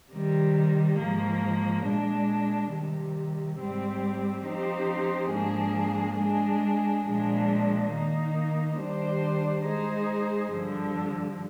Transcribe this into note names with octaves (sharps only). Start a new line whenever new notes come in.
C3 D#3 G3
G#2 F3 A#3
A#2 G#3 D4
C3 D#3 G3
G#2 G3 C4 G4
F3 C4 D#4 G4 C5
G#2 F3 A#3 D4 G#4
G#3 D4 G#4
A#2 F3 G#3 D4
D#3 A#3 D#4
D#3 G3 D4 G4 C5
G#3 D#4 G#4 C5
G2 D3 F3